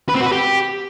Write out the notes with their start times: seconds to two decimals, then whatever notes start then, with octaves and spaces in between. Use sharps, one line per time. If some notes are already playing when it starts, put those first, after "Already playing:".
0.09 B4
0.15 C4
0.20 F#4
0.26 B4
0.32 G4